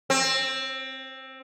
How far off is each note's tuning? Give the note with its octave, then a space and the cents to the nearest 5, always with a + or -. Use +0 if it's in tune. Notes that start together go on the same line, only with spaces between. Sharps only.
C4 +15